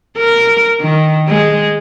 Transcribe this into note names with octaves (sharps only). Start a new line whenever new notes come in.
A#4
D#3
G#3